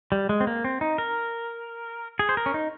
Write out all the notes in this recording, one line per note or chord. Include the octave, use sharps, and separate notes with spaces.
G3
G#3
C4
A#3
C4
D#4
A#4
G#4
C5
A#4
C#4
D#4